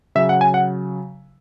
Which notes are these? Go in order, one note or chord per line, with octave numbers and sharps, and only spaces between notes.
C#3 F#3 E5
F#5
G#5
F#5